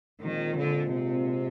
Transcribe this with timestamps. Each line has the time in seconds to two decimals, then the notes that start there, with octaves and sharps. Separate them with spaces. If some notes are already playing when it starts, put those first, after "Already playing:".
0.22 A#2 D#3 G#3 C4 F4
0.58 D3
0.94 C3